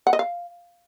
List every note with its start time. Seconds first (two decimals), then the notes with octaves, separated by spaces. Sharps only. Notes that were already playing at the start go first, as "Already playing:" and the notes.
0.07 F#5
0.13 D#5
0.19 F5